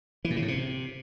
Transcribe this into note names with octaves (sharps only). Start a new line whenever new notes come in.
E3
A#2
C#3
A2
C3